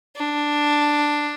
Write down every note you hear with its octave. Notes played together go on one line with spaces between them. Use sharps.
D4